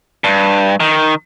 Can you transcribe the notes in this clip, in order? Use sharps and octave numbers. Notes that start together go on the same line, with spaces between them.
G2
D#3